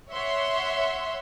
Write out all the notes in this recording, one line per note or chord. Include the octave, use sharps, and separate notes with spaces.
C#5 E5 F#5 C6